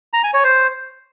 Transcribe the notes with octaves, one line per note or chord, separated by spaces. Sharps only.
A#5
G#5
C#5
C5